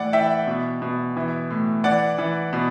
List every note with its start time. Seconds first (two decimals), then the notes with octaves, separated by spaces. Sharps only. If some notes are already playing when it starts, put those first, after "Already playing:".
Already playing: A2 E3 D5 F#5
0.13 E3 E5 G5
0.47 B2
0.82 B2
1.16 E3
1.50 A2
1.84 E3 D5 F#5
2.18 E3
2.53 B2